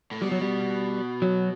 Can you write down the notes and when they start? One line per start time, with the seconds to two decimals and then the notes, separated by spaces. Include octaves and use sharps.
0.11 A2
0.22 B2 G3
0.32 F#3
0.41 G3
1.22 F#3